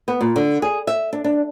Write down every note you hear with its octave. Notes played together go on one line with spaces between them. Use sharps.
B3
A#2
D3
G#4
E5
D4
D4